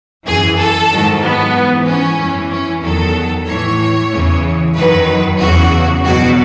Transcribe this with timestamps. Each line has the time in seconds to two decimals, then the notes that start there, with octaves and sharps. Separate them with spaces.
0.26 F#2 E3 G#4
0.58 A4
0.90 G#2 D#3 F#3
1.22 B3
1.54 G#2 E3
1.86 C#4
2.18 F#2 E3
2.50 C#4
2.82 E2 D#3 F#3 A4
3.46 A2 E3 C#5
4.11 E2 C#3 E3
4.75 F#2 D#3 F#3 B4
5.39 E2 C#3 E3 F#4
6.04 E2 B2 F#3 F#4